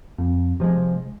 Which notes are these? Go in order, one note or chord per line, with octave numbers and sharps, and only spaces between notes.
F2
C3 F3 G#3